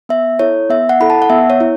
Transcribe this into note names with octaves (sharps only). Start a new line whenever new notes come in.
B3 E5
E4 A4 C#5
B3 E5
F#5
E4 A4 B5
A5
F#5
B3 E5
C#5
E4